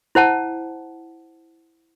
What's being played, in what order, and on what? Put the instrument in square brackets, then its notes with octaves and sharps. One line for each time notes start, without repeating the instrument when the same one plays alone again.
[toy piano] E4 C5 F#5 A5